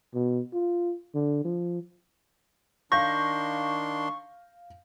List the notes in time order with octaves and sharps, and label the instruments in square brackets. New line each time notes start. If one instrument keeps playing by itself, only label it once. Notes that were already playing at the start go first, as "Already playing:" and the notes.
[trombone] B2
F4
D3
F3
[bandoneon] D#3 D4 C6 [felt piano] F5 G6 A#6 [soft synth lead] C#6